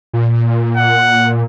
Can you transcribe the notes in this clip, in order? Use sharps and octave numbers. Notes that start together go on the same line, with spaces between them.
A#2
F#5